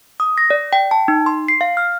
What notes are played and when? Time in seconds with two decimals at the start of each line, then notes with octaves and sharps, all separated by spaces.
0.20 D#6
0.38 A#6
0.50 D5
0.73 G5
0.91 A5
1.08 D#4
1.26 C6
1.48 C7
1.61 F5
1.77 F6